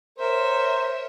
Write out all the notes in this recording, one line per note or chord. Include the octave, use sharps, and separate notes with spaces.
A#4 C5 C#5 E5